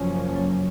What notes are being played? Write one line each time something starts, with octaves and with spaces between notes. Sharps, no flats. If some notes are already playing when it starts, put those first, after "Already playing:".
Already playing: F#1 F#2 F3 A#3 C#4
F#3